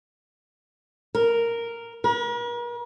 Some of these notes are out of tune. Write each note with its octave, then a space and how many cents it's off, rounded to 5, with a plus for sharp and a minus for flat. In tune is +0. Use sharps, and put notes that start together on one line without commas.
A#4 -5
A#4 +45